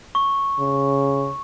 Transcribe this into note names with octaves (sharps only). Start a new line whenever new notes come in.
C#6
C#3